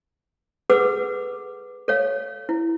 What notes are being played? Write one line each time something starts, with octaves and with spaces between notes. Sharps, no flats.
G#4 A4 B4 F#5 D6 E6
A4 C#5 F5
E4